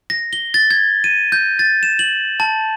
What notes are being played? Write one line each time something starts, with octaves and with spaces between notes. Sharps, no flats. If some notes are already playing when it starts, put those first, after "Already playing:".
A#6
G7
A6
G#6
D#7
G6
A6
E7
F#7
A5